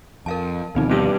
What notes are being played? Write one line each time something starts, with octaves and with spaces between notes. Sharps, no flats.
F2 A#4 F5 A5
D2 B2 D#3 F3 C4 D#4
G2 D#7